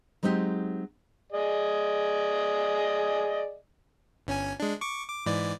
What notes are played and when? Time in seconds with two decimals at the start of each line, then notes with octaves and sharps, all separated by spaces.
0.23 F#3 G#3 C4 D#4 G4
1.32 G#4 D5 D#5
4.27 G1 C#4 G#5
4.60 G#3 D4
4.81 C#6 D6
5.09 D6
5.26 G#2 E3 D5